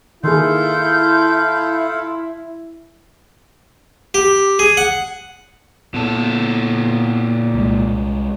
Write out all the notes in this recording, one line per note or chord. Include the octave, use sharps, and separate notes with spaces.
D#3 E4 F4 G#4 A4 F5 G6
G4
G#4
F#5
A#2 B3 A4
C2 G#3